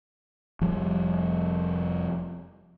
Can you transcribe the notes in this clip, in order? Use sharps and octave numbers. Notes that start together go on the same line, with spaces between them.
F1 F3 G3